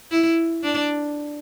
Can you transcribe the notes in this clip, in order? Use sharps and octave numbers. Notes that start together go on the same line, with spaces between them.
E4
D4